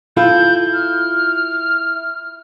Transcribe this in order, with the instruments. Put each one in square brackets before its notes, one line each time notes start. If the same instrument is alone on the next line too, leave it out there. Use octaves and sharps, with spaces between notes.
[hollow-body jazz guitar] E4 F4 A4 [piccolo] G6
[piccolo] F6